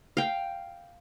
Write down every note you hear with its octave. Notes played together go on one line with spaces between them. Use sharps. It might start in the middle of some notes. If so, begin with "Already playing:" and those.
F5 G5